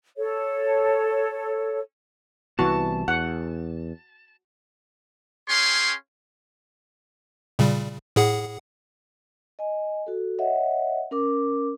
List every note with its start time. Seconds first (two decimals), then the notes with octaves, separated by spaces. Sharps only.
0.17 A4 C#5
2.59 C2 E3 B3 F#4 A5
3.08 E2 F#5
5.49 C#4 G#4 C#5 F5 G5 C6
7.59 A#2 C#3 G3
8.16 A2 G#4 F#5
9.59 D#5 G#5
10.06 F#4 A4
10.39 C#5 D#5 E5 F#5
11.11 C#4 A#4 D6